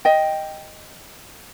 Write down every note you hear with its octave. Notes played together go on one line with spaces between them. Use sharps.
D#5 G5